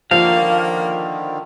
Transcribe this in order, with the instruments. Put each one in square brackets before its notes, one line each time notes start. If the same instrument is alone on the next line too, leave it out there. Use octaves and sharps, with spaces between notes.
[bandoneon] D3 D#3 [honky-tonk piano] F3 [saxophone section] A#3 [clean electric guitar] F5